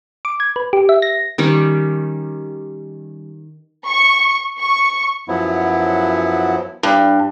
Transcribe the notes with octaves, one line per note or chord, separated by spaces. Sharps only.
D6
G#6
B4
G4
E5
A#6
D#3 G3 C#4
C#6
C#6
F#2 F3 F#3 B3 E4
G2